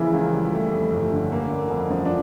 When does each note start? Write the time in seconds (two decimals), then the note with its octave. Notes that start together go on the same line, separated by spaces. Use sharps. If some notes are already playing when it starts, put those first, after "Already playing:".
Already playing: C#3 E3 F3 A#3 E4
0.13 C#2
0.33 G3
0.53 A3
0.72 F2
0.92 G1
1.11 D3
1.32 A#3
1.51 D3
1.70 F2
1.90 F3
2.05 D4